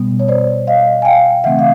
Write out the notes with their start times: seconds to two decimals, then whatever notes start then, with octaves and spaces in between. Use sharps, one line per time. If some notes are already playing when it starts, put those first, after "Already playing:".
Already playing: B2 G3 B3
0.20 C#5
0.28 C5 D5
0.67 D#5 F5
1.02 G#5
1.05 F5 G5
1.44 C#3 E3 A3 C4 E5 F#5
1.59 F5